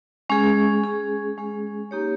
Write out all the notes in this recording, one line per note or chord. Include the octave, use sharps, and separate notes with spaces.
G#3 C#4 G#4
G#3 C#4 G#4
G#3 C#4 G#4
A#3 D#4 G4 C#5